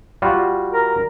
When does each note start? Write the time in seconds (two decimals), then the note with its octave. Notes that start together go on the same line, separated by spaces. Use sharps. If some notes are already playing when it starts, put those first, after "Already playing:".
0.22 G3 F4 F#4
0.73 A#4